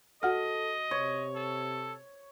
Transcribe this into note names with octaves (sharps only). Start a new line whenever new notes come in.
F#4 A4 D#5 F#5 F6
C3 C#5
A4